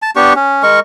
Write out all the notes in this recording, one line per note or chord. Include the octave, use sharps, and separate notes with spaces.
A5
B3 D4 G4 C#6
C#4
G#3 A#4 C#6